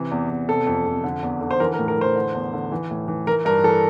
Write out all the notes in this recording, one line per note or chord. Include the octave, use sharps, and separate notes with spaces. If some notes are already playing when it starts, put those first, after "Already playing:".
Already playing: C3 E3
E2
E2
C3 A4
F2
F2
D3
E2
D3
C5
E3 A#4
A#4
A2
A#4
E3 C5
D3
E2
D3
E3
A2
E3
E3 A#4
G2 A#4
E3 A4